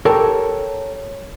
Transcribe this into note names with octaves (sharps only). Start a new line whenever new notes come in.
G4 A4 A#4 C#5 G5 A5